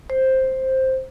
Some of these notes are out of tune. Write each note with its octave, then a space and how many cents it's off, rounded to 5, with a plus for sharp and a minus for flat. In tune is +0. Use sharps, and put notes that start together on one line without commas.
C5 +5